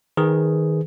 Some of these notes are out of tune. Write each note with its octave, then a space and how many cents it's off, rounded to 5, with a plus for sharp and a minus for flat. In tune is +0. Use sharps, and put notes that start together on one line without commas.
D#3 +20 G#4 +0 B4 +25